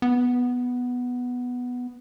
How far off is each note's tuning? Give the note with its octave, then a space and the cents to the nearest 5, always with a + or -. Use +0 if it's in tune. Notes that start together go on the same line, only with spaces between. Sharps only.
B3 +0